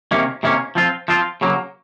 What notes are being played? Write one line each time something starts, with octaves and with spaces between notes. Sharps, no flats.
C3 D#3 A#3 C#4
C3 D#3 A#3 C#4
F3 C4 F4
F3 C4 F4
C#3 F#3 A#3